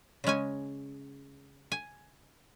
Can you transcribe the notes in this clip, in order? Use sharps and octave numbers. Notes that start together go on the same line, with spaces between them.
C#3 G#3 C#4 G#5
G#5